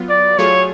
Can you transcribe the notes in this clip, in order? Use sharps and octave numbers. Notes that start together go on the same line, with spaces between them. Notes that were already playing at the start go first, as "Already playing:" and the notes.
Already playing: F#3 B3 F4
D5
F#3 A3 F4 G#4 C#5